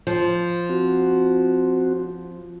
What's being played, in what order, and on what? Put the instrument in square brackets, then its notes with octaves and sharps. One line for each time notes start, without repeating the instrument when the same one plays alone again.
[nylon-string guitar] F3
[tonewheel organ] C4 F#4